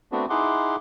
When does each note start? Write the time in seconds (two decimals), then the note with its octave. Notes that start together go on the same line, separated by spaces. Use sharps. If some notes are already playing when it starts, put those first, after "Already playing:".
0.12 A3 B3 C4 D4 F#4
0.30 D#4 E4 G#4 F#5 C6 D6